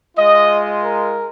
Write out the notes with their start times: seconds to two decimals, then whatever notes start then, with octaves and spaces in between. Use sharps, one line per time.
0.16 G#3 F4 D#5
0.82 A#4